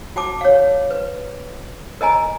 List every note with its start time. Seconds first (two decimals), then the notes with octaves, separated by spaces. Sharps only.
0.16 F#4 G5 A5 D6
0.41 C#5 F5
0.91 B4
2.01 A#4 D#5 G#5 A#5